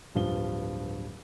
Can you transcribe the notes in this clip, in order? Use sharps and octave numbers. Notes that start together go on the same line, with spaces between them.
D1 G2 F3 G7